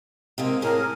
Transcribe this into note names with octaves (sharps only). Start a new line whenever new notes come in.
C3 G#3 A#3
A2 C#4 G#4 A#4